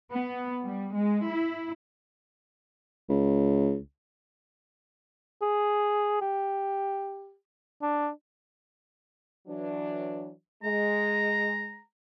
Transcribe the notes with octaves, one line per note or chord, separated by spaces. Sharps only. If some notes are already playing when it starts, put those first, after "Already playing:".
B3
G3
G#3
E4
C#2
G#4
G4
D4
E3 F#3 D4
G#3 A#5